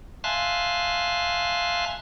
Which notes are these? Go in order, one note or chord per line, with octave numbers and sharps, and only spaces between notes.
E5 F5 G#5 A5 C6 F#6